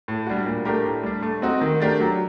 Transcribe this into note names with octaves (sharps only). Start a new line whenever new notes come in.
A2
G3 D4 F#4
A#2
A3 D4 G4 A#4
A2
G3 D4
A3
C4 D#4 F#4
D#3
A3 D4 G4 A#4
F#3